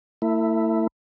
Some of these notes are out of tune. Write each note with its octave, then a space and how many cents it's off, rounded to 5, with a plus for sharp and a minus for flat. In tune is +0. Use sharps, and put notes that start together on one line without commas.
A3 +40 E4 +0